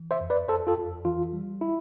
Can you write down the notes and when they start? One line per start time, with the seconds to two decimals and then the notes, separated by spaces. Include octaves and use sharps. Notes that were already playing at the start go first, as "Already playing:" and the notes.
Already playing: E3
0.11 C5 E5
0.21 F2
0.30 B4 D5
0.48 F2 A4 C5
0.67 F4 A4
0.77 F2
1.05 E3 F4
1.33 G3
1.61 E4